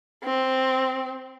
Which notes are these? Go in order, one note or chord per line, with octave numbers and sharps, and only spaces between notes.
C4